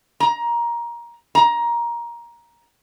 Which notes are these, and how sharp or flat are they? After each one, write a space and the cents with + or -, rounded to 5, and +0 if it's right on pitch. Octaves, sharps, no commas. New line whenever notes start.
A#5 +20
A#5 +15